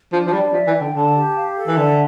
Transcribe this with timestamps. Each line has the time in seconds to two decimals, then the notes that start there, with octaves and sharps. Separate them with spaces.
0.12 F3 D4
0.27 F3
0.33 G3 D5
0.53 F3 E5
0.67 E3
0.74 G5
0.81 D3
0.94 D3 A5
1.15 G4
1.35 F5
1.55 A4
1.67 E3
1.77 D3 E5